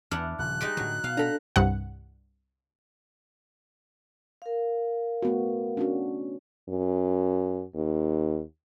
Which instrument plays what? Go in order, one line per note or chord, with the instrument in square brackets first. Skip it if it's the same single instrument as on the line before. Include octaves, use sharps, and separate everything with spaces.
[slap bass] E2 [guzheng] D4 E4 F#5 [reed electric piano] F6
[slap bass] D#1 C#3 F3 [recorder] F#6
[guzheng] G3 G#3 D#4
[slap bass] A2 D3 [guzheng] F#3
[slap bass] B2 [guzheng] F5
[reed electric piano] D4 A4 [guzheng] A#5 B5
[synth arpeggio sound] C2 G2 F#5
[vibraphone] A#4 F5
[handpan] A3 B3 F#4
C#4 D4 F#4
[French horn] F#2
D#2